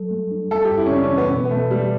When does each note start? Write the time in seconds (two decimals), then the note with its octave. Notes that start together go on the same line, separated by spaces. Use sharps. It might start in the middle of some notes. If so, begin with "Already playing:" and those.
Already playing: F#3 G3 A4
0.11 A3
0.31 D4
0.51 G3 A4
0.65 G4
0.71 F#2
0.77 E4
0.86 C#4
0.91 C#3 D4
1.04 C#4
1.11 E3
1.18 B3
1.30 B2 B3
1.45 B3
1.51 B2 A3
1.71 G3 A3